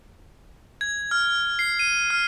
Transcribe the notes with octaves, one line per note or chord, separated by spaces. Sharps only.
G#6
F6
C7
D#7
F6